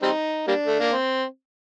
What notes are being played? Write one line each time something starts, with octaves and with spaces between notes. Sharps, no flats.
G3 C4 D#4
G3 A#3 D4
A3
A#3
C4